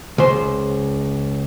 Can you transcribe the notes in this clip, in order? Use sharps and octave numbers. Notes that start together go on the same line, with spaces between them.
C#2 C5